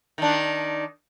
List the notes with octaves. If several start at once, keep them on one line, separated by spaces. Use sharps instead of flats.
D#3 D4